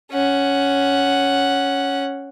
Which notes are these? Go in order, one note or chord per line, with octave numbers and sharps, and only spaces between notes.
C#4 F#5